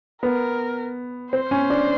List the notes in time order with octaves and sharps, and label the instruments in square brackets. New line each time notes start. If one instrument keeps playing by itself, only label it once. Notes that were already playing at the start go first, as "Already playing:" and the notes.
[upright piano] B3 [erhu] A#4
[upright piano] C4 [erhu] C5
[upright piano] C#4
D4